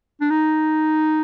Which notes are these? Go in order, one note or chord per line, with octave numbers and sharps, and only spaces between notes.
D4
D#4